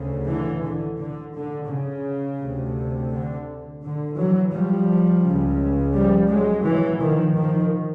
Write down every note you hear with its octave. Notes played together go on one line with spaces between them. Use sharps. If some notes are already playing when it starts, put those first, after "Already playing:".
Already playing: D2 C#3
D3 E3
D3
D3
D3
C#3
D2 C3
D3
D3
E3 F#3
F3 G3
C#2 C#3
F3 G3
F#3 G#3
E3 F#3
D#3 F3
D#3 F3